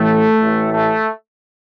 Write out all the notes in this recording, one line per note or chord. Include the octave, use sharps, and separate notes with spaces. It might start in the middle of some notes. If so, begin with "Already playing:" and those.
Already playing: A1 A2 E3 A3
A1 A2 E3
A3